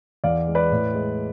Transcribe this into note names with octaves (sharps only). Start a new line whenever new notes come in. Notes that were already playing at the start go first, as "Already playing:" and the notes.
E2 D5 F5
G#3
B4 D5
A2
G#3